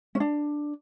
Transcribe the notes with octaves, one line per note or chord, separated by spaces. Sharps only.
C#4
D4